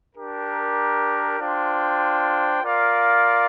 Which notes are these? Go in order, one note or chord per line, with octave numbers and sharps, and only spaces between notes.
D4 G4 A#4
D4 F4 C5 G5
F4 A#4 D5 F5